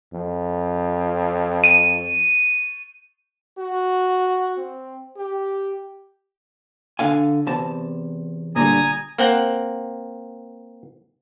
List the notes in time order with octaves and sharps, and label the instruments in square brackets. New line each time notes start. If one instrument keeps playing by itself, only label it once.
[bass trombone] F2
[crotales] D#7
[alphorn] F#4
C4
G4
[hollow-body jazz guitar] D3 F5 G#5
E2 C3 A5
[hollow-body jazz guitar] A#2 D3 G3 [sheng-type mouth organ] G#5 A#5 D#6
[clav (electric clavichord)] A#3 C4 F#5